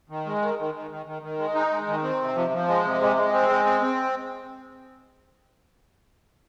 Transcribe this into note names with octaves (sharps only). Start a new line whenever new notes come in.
D#3
G#3
D#3
D#3
D#3
D#3
D#3
D#3
G#3
D#4
G#3
D#3
C4
C3
F3
F3
G#3
C3
G#3
G#3
C4
G#3
C4
C4